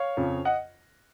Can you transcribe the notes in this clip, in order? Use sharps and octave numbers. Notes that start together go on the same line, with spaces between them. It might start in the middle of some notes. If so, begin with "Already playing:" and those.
Already playing: C#5 F5
F2 C#3 F3
D#5 F#5